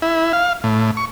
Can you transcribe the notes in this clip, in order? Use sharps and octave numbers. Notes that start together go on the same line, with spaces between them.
E4
F5
A2
C#6